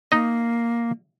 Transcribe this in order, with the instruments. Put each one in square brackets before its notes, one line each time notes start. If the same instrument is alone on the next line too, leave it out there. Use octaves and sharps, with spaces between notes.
[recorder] A#3 [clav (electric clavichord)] D#4 D#5